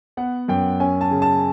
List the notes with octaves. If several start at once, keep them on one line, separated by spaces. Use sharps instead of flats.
B3 F#5
F#2 G5
C#4 G#5
A5
C#3
A5